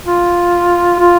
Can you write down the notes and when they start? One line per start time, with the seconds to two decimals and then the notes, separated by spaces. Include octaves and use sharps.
0.06 F4
0.99 F4